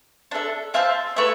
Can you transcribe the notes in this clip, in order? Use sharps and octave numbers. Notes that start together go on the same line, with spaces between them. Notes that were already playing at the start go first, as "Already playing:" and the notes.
D4 A4 E5
F4 C5 E5 A5
A3 E4 B4 E5